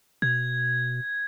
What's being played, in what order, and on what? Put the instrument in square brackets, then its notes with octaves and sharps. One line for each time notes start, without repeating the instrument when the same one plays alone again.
[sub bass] B2 [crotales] G#6